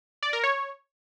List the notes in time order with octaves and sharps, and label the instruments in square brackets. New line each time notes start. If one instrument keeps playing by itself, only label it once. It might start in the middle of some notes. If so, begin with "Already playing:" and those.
[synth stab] D5
A#4
C#5